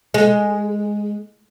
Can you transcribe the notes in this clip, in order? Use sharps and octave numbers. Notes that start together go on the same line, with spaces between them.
G#3